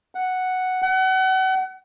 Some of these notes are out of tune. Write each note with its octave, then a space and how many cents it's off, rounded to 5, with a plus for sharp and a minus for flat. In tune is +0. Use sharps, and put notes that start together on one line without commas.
F#5 +0
F#5 +35